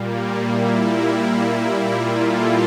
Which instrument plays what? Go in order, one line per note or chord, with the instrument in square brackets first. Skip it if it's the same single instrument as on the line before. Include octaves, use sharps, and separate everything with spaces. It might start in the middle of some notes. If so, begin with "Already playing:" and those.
Already playing: [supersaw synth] A#2 G3 A#3
E4
F4
A4